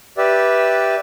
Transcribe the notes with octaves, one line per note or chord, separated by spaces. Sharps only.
G4 B4 D5 E5